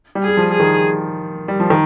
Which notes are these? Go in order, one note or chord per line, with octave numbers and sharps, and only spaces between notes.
G3
G#4
G3
F3
G#4
D#3
G3
F3
D#3